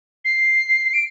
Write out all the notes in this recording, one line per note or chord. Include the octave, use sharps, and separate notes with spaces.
C7
D7